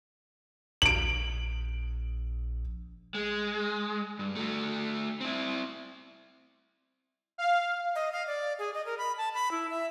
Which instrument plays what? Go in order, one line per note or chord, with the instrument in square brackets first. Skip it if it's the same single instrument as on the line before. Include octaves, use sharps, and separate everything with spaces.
[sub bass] A#1 [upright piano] D7 F#7
[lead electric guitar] G#3
G2
A3 F#4
C4 E4
[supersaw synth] F5
[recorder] D#5
F5
D5
G#4
D#5
A#4
B5
A5
B5
E4
E5